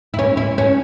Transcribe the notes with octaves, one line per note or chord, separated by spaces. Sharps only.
E4
C#4
E4
C#4